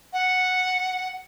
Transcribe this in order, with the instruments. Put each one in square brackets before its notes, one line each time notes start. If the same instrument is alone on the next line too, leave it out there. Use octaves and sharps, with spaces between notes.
[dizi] F#5